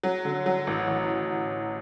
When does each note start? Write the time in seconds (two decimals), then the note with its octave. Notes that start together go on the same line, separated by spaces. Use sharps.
0.04 F#3
0.25 D3
0.46 F#3
0.67 A1
0.88 A1